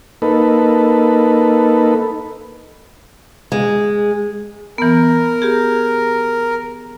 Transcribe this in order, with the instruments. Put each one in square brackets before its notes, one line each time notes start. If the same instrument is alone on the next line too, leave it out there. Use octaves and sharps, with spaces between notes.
[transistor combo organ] A#3 D#4 A4 B4
[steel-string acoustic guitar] G#3
[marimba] E3 B3 [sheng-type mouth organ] A#4
[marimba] G4 G#4